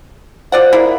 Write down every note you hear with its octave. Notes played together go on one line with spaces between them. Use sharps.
F4 C5 D5 F#5
A#3 E4 G#4